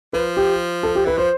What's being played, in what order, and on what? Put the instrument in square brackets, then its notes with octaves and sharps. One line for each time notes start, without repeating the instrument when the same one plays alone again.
[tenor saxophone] F3 [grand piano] B4
[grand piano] G4
A4
G4
[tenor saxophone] E3 [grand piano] B4
[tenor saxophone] F3 [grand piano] C5